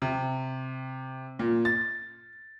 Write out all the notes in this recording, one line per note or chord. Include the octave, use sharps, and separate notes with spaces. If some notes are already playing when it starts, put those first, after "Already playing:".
C3
A#2
A6